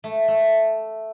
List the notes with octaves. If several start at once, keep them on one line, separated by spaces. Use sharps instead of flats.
A3
A3